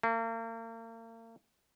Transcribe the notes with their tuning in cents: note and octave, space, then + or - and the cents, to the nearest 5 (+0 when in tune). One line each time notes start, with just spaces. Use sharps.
A#3 -40